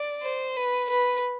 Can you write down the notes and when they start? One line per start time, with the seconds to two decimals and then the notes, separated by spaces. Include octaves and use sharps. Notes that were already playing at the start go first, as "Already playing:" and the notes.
Already playing: D5
0.23 C5
0.56 B4
0.90 B4